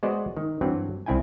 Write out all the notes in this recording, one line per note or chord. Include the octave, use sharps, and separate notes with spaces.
G#3 B3 F#4 C5 D5 D#5
D#3
G2 E3 F#3 C4
C2 C4 E4 G5 G#5